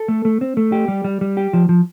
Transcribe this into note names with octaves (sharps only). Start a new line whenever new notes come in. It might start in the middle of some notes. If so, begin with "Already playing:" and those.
Already playing: A4
A3
A3
C4
A3
G4
G3
G3
G3
G4
F3
F3